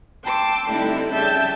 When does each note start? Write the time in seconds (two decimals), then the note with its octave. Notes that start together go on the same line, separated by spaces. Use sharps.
0.23 G5 A5 C6 D6 E6
0.68 D3 G3 C4 D#4 E4
1.12 C#3 G3 E5 A5 G6